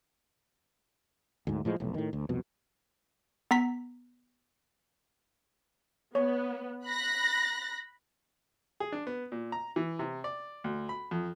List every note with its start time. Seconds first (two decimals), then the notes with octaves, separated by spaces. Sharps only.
1.47 D2 G#2
1.65 A2 F3 G#3
1.80 F1 B1 A2
1.94 A2 D#3
2.13 D2
2.29 C2 F2 B2
3.51 B3 A#5 B6
6.15 B3 C#5
6.85 B5 F#6 A#6
8.80 G#4
8.92 D4
9.07 B3
9.32 A#2
9.52 A#5
9.76 E3
9.99 C3
10.24 D5
10.64 D2
10.89 B5
11.11 F2